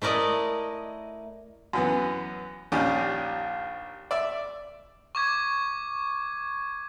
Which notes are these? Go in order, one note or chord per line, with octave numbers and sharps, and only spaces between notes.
A3 E4 A#4 D5 D#5
F#2 E3 B3
A#1 D#2 C#4 D4 G4
D5 E5
C#6 D6 G#6